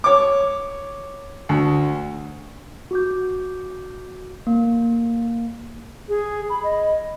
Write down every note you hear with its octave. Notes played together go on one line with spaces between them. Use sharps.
C#5 D6
D2
F#4 D6 G6
A#3
G#4
B5
D#5